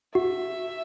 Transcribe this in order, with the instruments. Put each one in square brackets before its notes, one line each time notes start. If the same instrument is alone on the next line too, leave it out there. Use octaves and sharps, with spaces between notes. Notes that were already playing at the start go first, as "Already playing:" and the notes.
[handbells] F#4 [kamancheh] E5